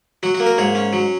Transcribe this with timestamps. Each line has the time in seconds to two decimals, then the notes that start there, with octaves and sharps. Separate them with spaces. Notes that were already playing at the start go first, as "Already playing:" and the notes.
0.23 F#3 F#4
0.35 F#4
0.40 A#3
0.46 A#4
0.58 G#2 C#5
0.75 C#4
0.93 F#3